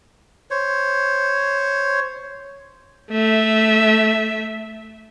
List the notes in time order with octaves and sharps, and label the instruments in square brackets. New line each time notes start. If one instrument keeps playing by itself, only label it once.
[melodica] C5 C#5
[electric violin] A3 E5